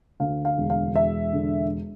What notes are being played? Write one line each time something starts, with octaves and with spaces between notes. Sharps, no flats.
D2 F5
F5
E1
F5
E1 E5
D3